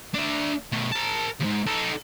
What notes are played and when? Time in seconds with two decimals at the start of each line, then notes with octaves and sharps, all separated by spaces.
0.15 D4 E5
0.72 B2 A3
0.92 A#4 A5
1.40 D#2 G#2
1.66 D#4 A4